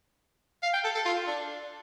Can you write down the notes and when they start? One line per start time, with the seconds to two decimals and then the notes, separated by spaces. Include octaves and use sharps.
0.63 F5
0.73 G5
0.84 A4
0.95 A4
1.06 F4
1.27 D4